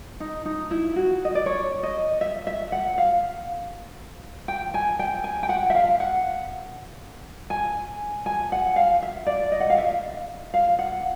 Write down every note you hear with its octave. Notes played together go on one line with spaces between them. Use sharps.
D#4
D#4
E4
F#4
D#5
D5
C#5
D#5
E5
E5
F#5
F5
G5
G#5
G5
G#5
G5
F#5
E5
F5
F#5
G#5
G#5
F#5
F5
E5
D5
D#5
F#5
F5
E5
F5
F#5